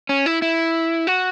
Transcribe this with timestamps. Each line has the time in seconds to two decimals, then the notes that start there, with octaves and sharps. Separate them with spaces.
0.09 C#4
0.26 E4
0.42 E4
1.07 F#4